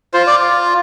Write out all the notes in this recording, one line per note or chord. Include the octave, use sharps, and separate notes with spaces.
F4 C5
D5